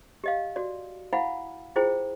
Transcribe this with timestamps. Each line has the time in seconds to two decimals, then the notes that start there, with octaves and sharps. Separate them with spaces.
0.24 G4 D#5 F5
0.56 F#4 D5
1.13 E4 F5 F#5 G#5 B5
1.76 E4 F4 G#4 C5 G5